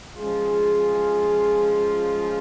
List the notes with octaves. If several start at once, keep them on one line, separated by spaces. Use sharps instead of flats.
F3 G#3 C#4 F4 G#4